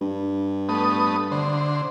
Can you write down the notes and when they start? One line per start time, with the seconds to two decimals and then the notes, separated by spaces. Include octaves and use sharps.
0.01 G2
0.69 A3 B3 D#6
1.31 D3 C5